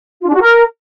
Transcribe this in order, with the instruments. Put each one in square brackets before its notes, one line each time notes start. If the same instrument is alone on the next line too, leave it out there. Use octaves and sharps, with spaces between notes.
[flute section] F4
D4
F#4
A#4